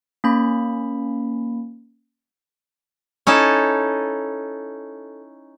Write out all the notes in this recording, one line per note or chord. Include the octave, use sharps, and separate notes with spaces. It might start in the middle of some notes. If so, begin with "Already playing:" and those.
A#3 C#4 B5
C#4 D#4 E4 A4